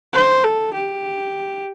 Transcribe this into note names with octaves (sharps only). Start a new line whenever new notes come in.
C5
A4
G4